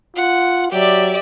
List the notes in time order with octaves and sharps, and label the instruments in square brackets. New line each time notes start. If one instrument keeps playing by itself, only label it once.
[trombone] F4 [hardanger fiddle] F#5
[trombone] F#3 [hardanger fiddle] G4 [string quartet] D5 E5